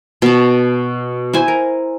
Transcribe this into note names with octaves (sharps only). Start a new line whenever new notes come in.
B2 A5
E4 C5 G#5
A#4